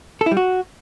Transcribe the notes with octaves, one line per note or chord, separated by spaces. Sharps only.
A4
E4
G3
F#4